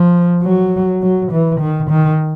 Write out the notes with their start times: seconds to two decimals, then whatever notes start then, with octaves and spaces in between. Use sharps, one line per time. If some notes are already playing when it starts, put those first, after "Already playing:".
Already playing: F3
0.43 F#3
1.02 F#3
1.32 E3
1.60 D#3
1.90 D#3